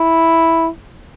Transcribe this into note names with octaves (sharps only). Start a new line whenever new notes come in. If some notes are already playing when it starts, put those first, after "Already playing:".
Already playing: E4